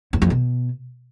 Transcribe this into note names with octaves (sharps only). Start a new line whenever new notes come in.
E2
F2
B2